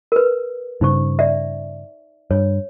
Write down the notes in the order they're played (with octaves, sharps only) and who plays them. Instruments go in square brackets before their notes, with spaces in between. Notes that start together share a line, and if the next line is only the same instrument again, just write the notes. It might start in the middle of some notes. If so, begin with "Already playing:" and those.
[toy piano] A#4 B4
[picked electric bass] G2 C#3 [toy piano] D#4 C5 C#6
[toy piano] D5 E5
[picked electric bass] G2 [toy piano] C#5